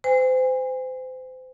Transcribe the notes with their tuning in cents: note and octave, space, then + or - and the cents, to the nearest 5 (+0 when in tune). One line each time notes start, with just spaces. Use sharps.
C5 -30 G#5 -40